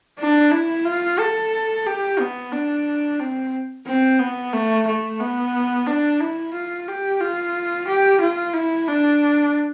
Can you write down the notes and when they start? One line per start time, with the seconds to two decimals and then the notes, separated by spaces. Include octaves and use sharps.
0.19 D4
0.52 E4
0.85 F4
1.19 A4
1.86 G4
2.19 B3
2.53 D4
3.20 C4
3.87 C4
4.19 B3
4.53 A3
4.87 A3
5.20 B3
5.87 D4
6.20 E4
6.54 F4
6.88 G4
7.20 F4
7.87 G4
8.21 F4
8.54 E4
8.88 D4